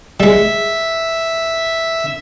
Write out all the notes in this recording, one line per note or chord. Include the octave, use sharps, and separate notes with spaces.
G3 G#3 E5